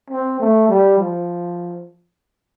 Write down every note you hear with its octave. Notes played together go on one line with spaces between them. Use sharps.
C4
A3
G3
F3